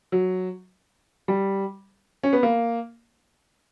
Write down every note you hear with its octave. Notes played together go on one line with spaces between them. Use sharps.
F#3
G3
C#4
B3
A#3